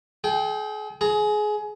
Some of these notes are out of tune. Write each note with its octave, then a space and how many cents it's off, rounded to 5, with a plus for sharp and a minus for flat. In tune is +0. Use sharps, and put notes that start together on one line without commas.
G#4 +40 G5 +0
G#4 +20 A#5 -20